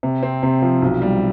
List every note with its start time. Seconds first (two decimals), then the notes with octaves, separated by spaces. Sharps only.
0.03 C3
0.23 C4
0.43 C3
0.62 F3
0.82 B1
1.02 G3